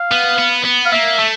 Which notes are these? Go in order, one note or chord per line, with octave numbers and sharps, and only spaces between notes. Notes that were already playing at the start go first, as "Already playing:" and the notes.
Already playing: F5
B3
B3
B3
F5
A#3 E5
A3